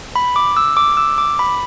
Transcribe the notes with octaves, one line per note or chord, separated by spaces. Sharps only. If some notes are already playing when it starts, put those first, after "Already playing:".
B5
D6
E6
D6
D6
E6
D6
B5